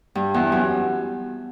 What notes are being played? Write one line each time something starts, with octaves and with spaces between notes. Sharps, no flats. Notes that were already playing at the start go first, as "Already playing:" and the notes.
G2
E2
F#2